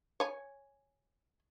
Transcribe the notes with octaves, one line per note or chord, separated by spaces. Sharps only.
C#5 G#5